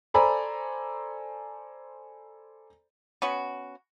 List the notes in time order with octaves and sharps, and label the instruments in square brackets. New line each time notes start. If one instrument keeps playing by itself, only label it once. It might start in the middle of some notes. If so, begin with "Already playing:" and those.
[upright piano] A4 C5 D5 G#5 A#5 B5
[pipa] B3 C#4 F#4